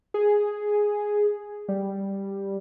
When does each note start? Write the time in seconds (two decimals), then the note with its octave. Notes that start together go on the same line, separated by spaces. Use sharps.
0.14 G#4
1.68 G3